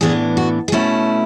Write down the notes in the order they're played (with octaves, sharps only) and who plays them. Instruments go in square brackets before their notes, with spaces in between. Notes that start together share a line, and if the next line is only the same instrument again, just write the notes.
[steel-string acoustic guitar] A2 E3 B3 D4 G#4
F#4
G#4
B2 A3 C#4 E4 F#4